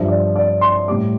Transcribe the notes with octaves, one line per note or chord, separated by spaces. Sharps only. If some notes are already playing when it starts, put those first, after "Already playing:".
Already playing: G2 F3 E5
D5
D5
C6
A2 G3 D6